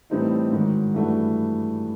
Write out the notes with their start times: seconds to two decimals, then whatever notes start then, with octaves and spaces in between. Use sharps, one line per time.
0.10 A2 E3 G3 C4 D#4
0.52 G#2 D#3 F#3
0.94 G2 E3 A3 D4 F#4